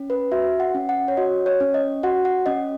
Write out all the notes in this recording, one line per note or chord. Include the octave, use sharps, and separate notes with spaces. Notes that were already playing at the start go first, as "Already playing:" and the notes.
Already playing: C#4
B4
F#4 E5
F#5
C#4
F#5
C#5
F#4 D#5
C#5
C#4
D#5
F#4 F#5
F#5
C#4 D#5